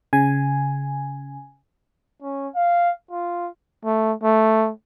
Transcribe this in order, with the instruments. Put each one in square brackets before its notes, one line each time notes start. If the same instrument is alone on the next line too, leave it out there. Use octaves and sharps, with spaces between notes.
[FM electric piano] C#3 G#5
[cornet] C#4
F5
F4
A3
A3